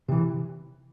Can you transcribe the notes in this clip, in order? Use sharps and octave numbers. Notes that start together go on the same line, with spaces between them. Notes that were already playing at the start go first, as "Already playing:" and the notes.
C3 E3